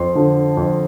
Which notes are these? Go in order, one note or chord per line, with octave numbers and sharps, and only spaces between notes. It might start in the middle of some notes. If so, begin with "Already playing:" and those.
Already playing: F2 C6
D3 F3
F2